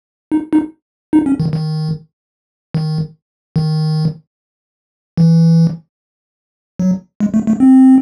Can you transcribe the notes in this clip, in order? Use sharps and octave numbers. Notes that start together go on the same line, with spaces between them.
D#4
D#4
D#4
C#4
D#3
D#3
D#3
D#3
E3
F#3
G#3
A3
A3
C4